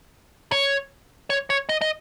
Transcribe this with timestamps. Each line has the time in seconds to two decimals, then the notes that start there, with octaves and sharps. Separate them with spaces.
0.52 C#5
1.30 C#5
1.50 C#5
1.69 D#5
1.81 D#5